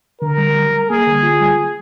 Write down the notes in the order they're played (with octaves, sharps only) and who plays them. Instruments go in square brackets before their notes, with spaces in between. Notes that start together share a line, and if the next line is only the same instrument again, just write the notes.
[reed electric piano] D3 [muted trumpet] A#4
[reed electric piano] G3
G3
G3
[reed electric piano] A#3 [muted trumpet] G#4
[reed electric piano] D3
F4
G3